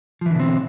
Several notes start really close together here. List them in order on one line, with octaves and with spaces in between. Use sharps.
F3 E3 D3 B2 C4